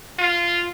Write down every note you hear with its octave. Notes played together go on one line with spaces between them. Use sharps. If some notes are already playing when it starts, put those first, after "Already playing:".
F4